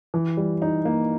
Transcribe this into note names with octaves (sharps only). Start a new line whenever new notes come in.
E3
G3
D#4
A#3